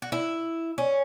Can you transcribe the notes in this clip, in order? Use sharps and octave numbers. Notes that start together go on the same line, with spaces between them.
F#4
E4
C#4